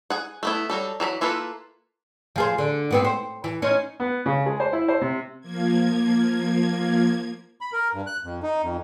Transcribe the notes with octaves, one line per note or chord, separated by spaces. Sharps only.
G#4 F#5
A3 B3 E4
F#3 G3 A4
E3 F#3 A#5 B5
A#3 E4 F4 A4 B4
F3 G#4 C5
D3
G#2 B3 C4
C5
E3
C#4 D#4 C5
B3
C#3
G#3
C5
E4
C5
C3
F3 A#3 G#6
B5
A#4
G2
F#6
F2
D#4
F2